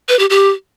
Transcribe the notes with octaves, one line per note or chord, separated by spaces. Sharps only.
B4
G4
G4